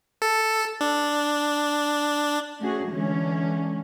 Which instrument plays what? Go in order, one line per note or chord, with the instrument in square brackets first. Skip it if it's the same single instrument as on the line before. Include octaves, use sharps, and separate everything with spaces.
[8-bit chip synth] A4
D4
[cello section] A3 C#4 F#4 G#4
D3 E3 G#3 C#4